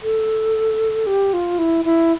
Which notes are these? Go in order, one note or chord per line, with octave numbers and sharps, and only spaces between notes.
A4
G4
F4
E4
E4